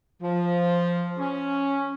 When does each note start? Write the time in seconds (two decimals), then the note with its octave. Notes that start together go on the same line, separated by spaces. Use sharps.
0.22 F3
1.19 C#4